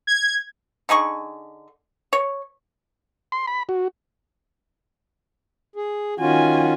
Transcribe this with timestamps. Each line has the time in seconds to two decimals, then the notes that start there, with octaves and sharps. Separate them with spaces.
0.07 G#6
0.89 D3 D#4 G#4 C#6
2.13 C#5
3.32 C6
3.47 B5
3.69 F#4
5.76 G#4
6.20 D#3 C#4 F4 F#4 G#5